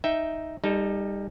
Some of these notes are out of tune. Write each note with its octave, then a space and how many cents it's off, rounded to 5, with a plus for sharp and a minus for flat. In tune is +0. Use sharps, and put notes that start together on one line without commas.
D#4 +0 E5 +0 G5 +0
G3 +25 D#4 +0 A4 -10